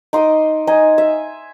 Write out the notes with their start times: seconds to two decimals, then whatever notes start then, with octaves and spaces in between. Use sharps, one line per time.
0.13 D#4 C6 D6 D#6
0.67 D#4 G#5
0.98 E5